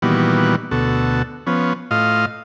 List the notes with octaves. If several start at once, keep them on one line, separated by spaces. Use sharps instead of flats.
A#2 D#3 E3 G3 B3 F#4
D2 B2 F#4 A4
F3 B3 C#4
A2 F4 D#5 F5